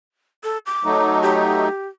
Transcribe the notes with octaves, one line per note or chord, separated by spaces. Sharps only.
A4
D6
F#3 A3 D#4
G4